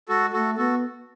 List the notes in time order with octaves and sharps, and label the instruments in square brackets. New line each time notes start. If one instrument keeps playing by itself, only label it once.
[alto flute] G#3 [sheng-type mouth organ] F#4 A4
[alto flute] A3 [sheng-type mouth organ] F#4 A4
[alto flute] B3 [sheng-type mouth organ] F#4 A4